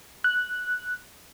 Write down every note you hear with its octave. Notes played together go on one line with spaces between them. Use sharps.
F#6